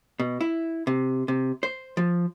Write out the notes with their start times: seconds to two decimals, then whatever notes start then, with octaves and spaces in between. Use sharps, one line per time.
0.20 B2
0.41 E4
0.87 C3
1.28 C3
1.63 C5
1.97 F3